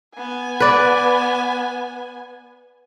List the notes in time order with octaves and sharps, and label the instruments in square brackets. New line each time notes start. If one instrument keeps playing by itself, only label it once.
[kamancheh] B3 G#5
[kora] B4 D5